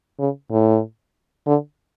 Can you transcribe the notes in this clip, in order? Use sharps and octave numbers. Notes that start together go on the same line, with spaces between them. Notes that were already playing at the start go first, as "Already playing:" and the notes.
C#3
A2
D3